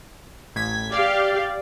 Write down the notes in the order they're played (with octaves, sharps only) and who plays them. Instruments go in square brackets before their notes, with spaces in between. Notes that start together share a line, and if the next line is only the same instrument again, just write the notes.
[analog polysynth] A1 G#6 B6
[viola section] G4 F5 [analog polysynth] D5